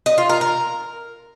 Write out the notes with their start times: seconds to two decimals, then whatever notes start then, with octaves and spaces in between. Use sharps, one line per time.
0.06 D#5
0.18 F4
0.29 A#4
0.41 A#4